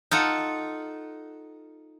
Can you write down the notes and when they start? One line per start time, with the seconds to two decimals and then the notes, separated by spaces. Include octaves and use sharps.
0.11 D#4 F4 A4 F#5